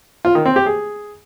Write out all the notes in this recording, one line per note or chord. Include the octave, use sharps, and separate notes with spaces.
F4
D#3
C4
G4
G#4